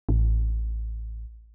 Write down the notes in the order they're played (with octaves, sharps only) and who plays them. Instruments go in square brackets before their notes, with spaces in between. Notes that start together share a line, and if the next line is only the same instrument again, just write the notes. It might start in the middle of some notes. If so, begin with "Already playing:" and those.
[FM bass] A1